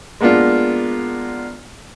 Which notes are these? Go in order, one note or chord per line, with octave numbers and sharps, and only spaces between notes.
G#3 A#3 B3 D4 F4